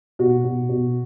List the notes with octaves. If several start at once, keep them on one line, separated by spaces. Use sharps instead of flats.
B2 F#4
B2
B2